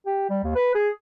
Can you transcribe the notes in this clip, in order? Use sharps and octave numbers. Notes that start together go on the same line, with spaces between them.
G4
G3
D#2
B4
G#4